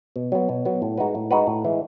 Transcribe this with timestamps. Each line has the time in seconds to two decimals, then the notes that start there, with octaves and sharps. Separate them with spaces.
0.16 B2
0.32 F#3 B3
0.49 B2
0.65 F#3 B3
0.82 A2
0.98 G#3 D#4 F#4 B4
1.15 A2
1.31 G#3 D#4 F#4 B4
1.47 A2
1.65 E3 G#3